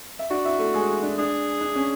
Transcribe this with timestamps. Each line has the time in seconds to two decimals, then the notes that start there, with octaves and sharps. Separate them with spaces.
0.19 E5
0.30 D4 F#4 D5
0.44 E4 E5
0.59 A3 A4
0.74 G#3 G#4
1.03 D4
1.18 D4 G#4
1.61 D4
1.76 C#4